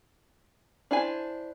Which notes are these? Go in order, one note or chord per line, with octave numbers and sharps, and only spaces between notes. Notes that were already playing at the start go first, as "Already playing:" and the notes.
D4 E4 C5 G#5